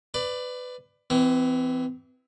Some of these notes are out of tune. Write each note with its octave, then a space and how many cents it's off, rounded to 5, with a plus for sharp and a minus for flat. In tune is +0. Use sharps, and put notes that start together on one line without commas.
B4 +20 D5 +10
E3 +0 C4 -35